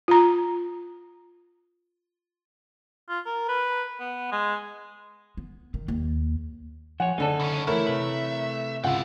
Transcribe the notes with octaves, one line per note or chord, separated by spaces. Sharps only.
F4 A#5
F4
A#4
B4
B3
G#3
B3
D#3
D#2
F3 C#5 F#5 G#5
F#1 D3 D#4 A4
C2 C#4
E3 A3 E4 A#4 C#5
C3 B4 E5
C#2 C4 E4 F4 F#5